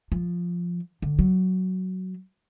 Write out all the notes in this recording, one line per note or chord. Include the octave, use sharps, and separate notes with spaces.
F3
D3
F#3